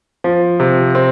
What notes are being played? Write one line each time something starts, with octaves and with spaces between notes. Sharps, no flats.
F3
C3
C4